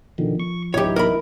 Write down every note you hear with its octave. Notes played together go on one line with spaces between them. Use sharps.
B2 D3 D#3 F3
C#6
A1 D2 E3 F#3 D#4 E4 G4 C#5
A#4 B5